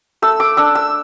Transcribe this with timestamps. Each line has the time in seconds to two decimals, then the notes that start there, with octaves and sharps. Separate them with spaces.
0.22 A3 E6
0.40 D6
0.57 D4 E6
0.75 E6